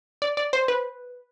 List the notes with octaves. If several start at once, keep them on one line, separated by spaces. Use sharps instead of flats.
D5
D5
C5
B4